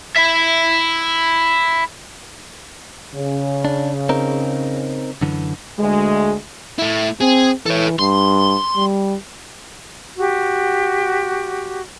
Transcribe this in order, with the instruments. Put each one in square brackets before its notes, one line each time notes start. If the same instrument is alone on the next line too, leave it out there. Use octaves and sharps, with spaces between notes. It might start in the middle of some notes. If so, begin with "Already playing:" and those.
[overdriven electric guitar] E4 E5
[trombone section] C#3
[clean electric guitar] D4
C4 D#4 A#4
F#2 D3 E3
[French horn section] D2 G#3
[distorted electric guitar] A3 E4
[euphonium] C4 [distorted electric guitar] G#4
[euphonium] E3 [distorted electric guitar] A4 C#5
[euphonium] G2 [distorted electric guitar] C6
[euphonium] G3
[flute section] F#4 G4